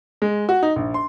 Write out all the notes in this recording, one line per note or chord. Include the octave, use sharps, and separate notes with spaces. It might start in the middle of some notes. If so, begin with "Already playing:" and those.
G#3
F#4
D#4
A#1
C6